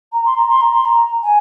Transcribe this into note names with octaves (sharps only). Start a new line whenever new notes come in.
A#5
C6
A#5
C6
A#5
C6
A#5
G#5